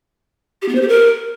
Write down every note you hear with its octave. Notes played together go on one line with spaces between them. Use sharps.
G4
B3
C5
G4
A#4